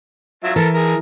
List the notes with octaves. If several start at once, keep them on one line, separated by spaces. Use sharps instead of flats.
F#3 F4 E5
E3 A4 A#4
G#4 A#4